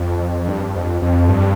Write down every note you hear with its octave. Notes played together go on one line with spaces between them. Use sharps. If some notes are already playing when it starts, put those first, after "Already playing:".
Already playing: F2
G2
F2
F2
G2